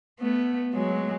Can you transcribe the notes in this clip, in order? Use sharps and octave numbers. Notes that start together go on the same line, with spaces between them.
A3 B3
F#3 G#3